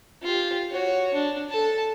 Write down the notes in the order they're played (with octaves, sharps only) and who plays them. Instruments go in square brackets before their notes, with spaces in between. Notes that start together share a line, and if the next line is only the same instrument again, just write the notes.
[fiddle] F4 G4
F#4 C#5
D4
A4 A5